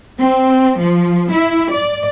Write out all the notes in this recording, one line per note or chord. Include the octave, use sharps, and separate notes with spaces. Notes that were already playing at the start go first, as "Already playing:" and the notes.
C4
F3
E4
D5